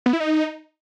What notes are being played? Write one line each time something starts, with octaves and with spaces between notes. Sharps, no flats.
B3
E4
D#4